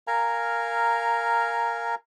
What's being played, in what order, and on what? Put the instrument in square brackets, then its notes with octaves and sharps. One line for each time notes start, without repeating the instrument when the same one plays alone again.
[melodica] A#4 F5 G#5 A#5